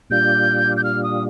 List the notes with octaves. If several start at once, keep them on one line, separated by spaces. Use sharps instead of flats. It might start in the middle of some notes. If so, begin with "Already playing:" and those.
A#2 G3 D4 F4 G6
G6
F6
D#6